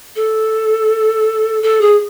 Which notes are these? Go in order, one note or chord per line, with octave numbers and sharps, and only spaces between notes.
A4
A4
G#4